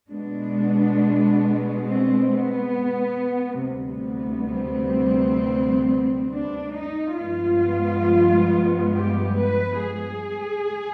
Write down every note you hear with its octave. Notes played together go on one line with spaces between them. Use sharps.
B2 G#3 B3 D4
C4
B3
D2 C3 G3 B3
C4
D4
D#4
G2 F3 G#3 B3 F4
G4
B4
G#4